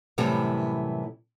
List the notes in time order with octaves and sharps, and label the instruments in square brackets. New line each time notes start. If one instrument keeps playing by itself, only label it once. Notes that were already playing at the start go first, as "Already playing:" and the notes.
[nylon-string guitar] F#2 A2 C3 E3 G3